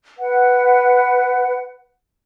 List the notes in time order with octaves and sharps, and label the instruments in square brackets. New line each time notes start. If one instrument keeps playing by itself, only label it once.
[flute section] B4 F#5